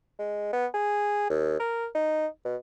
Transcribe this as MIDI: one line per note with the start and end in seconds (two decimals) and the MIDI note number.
0.19 0.53 56
0.53 0.67 59
0.74 1.27 68
1.30 1.60 39
1.60 1.87 70
1.95 2.27 63
2.45 2.56 47